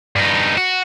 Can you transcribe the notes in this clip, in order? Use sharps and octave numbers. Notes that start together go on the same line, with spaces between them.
G2 D#4
F#4